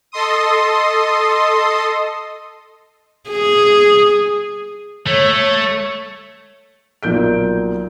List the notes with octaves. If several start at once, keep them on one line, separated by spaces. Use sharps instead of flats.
A4 D#5 C6 D#6
G#4
A3 C#5
B1 A#2 G6 D7